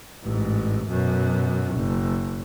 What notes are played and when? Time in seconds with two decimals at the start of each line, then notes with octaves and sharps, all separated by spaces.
0.23 A1 G#2
0.89 F#2 B2
1.75 F#1